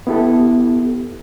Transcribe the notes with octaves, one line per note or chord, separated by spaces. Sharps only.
B3 E4 G4 A4